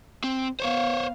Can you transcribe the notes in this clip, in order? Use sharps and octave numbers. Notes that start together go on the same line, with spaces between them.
C4
B3 C5 C#5 F5